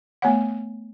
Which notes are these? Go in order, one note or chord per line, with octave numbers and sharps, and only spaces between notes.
A3 B3 C#5 F#5